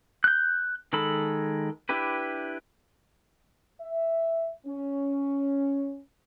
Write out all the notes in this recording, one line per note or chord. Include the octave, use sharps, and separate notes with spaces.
F#6 G6
D#3 G#3 A4 B5
D4 E4 G4 B4
E5
C#4